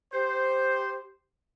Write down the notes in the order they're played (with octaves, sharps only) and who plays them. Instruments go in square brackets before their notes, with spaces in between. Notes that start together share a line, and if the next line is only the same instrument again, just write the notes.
[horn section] G4 C5